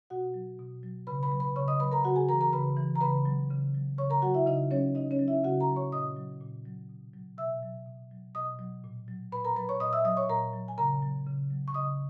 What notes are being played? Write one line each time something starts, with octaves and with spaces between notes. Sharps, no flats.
B2 F#4 F#5
F#3
B2
F#3
C#3 B4 B5
B4 B5
F#3
B4 B5
C#3 C#5 C#6
D#5 D#6
F#3 B4 B5
A#4 A#5
C#3 F#4 F#5
G#4 G#5
E3 A#4 A#5
A#4 A#5
C#3 B4 B5
E3
A#5
C#3 B4 B5
F#3
C#3
F#3
C#3 C#5 C#6
A#4 A#5
F#3 F#4 F#5
E4 E5
C#3 D#4 D#5
F#3 C#4 C#5
C#3 D#4 D#5
C#4 C#5
F#3
E4 E5
C#3 F#4 F#5
A#4 A#5
F#3
C#5 C#6
A#2 D#5 D#6
F#3
A#2
F#3
B2
F#3
B2 E5 E6
F#3
B2
F#3
B2 D#5 D#6
F#3
A#2
F#3
A#2 B4 B5
A#4 A#5
F#3 B4 B5
C#5 C#6
A#2 D#5 D#6
E5 E6
F#3 D#5 D#6
C#5 C#6
A#2 A#4 A#5
F#3
G#5
C#3 A#4 A#5
F#3
C#3
F#3
C#6
C#3 D#5 D#6